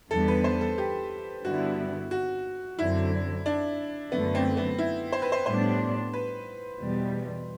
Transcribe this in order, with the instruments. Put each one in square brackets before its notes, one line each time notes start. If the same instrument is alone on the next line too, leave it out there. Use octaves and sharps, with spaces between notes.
[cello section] E2 D3 G3 B3 [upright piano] A4
[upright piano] B4
C5
A4
G4
[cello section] G2 D3 G3 B3 E4 [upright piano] F#4
[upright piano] F#4
[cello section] F#2 D3 F#3 C4 [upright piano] E4
[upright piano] D4
[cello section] F#2 D3 A3 [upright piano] B3
[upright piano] C4
B3
E4
C5
B4
C5
[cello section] A2 G3 B3 D4 [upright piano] C5
[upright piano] B4
[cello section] E2 B2 G3